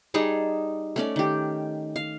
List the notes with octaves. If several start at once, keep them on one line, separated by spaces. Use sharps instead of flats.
G3 D#4 G#4 A5
A3 C#4 D5
D#3 G4
F5